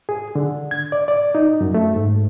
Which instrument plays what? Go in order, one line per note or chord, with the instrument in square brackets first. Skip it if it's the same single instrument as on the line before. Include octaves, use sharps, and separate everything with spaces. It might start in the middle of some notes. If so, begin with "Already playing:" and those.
[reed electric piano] G#4
D3
G#6
D5
D5
D#4
F#2
A3
G#2